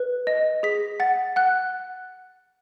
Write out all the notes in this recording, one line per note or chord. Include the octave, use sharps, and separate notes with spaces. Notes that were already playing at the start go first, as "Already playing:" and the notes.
Already playing: B4
D#5
G#4 B6
F#5 A6
F#5 F#6